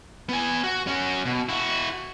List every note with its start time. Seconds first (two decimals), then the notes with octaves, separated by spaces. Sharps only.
0.29 B3 G#5
0.64 F#4
0.87 C#4 F#4
1.25 B2
1.49 E4 F#4